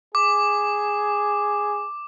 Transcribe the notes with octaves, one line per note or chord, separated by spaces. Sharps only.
G#4 D6